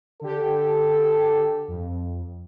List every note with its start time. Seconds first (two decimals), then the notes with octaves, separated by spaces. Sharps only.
0.21 D3 G4 A4
1.68 F2